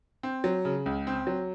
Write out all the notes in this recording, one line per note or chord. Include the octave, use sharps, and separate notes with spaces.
C4
F#3
C#3
C#2
C4
F#3